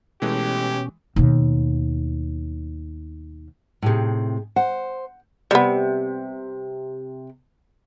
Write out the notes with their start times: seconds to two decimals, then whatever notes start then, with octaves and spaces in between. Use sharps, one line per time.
0.22 B2 E3 G#3 A3 C#4 G4
1.16 D#2 B2
3.82 A2 C3 D#4 G4 G#4
4.56 C5 F#5
5.51 C3 G3 B3